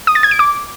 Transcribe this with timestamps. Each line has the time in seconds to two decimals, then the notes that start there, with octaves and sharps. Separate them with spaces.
0.07 D#6
0.15 A6
0.23 G#6
0.31 D7
0.39 D6